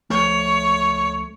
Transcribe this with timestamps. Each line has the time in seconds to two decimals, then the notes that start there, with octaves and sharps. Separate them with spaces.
0.10 C#2 F3 A3 C#5